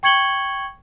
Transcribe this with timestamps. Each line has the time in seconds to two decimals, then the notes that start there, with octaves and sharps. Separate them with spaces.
0.03 G5 C#6 G#6 C#7 F#7 G7